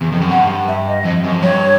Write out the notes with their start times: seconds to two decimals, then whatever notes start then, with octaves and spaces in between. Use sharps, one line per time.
0.02 E2
0.13 F2
0.22 F#2
0.31 G2 F#5
0.68 E5
0.88 D#5
1.05 F2
1.24 F#2
1.33 F2
1.42 G2 C#5